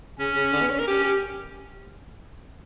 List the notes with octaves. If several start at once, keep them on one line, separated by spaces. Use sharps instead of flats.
C#3 C#4
C#3
D3
B3
C#4
A#4
C#4 G4
G4